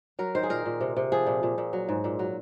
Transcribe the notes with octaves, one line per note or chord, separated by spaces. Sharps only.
F#3 A#4
D#3 C5
G#4
A#2 A#4
A#2
C3
C3
F3 G#4
A#2
A#2
A#2
F#3
G#2
A#2
F#3